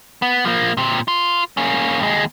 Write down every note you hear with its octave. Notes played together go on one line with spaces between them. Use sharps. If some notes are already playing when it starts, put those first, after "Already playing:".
B3
F3 A#3
A#2 C4
F4
A#3 C#4
D#2 G#3